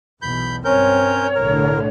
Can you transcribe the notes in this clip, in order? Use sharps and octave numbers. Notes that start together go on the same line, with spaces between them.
B1 E2 B2 B5 G6
G2 C4 C#4 A#4 C#5 G6
B1 A2 D3 A#4